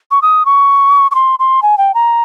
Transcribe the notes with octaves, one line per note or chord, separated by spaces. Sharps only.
C#6
D#6
C#6
C#6
C6
C6
G#5
G5
A#5